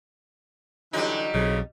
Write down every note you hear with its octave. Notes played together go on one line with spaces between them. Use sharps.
D3 E3 F#3 G3 D#4
B1 F2 C#3 F#3